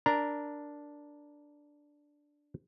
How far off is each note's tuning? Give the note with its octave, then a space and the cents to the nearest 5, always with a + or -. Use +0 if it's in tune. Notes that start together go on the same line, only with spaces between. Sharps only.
D4 +0 A#4 +0 A#5 +0